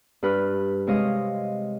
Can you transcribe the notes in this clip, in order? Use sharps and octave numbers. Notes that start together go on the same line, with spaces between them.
G2 B4 F6
C3 G#3 C#5 D#5 F5 D#6